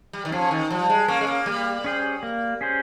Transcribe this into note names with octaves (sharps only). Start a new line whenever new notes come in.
G3
D#3
F3 C#4 G#4 C#5
D#3
F3 G3
G#3
A#3 C#4 G#4 C#5
G#3
A#3
G3 A#3
C#4 G#4 C5
A#3
C#4 G#4 C5